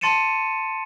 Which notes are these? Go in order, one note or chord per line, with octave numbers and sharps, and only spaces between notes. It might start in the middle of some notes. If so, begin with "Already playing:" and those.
A5 C6 A6 C#7 D#7 E7